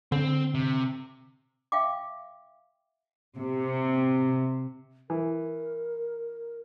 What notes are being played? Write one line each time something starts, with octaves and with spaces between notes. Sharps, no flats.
D3 C4
C3
E5 F5 G5 D6
C3
E3 A#4